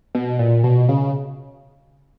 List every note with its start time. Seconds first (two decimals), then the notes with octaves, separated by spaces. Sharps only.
0.15 B2
0.39 A#2
0.64 B2
0.89 C#3